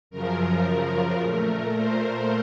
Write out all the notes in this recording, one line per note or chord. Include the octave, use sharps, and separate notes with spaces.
F#2 C#3 F3 A#4
A#2 A3 A#4
C5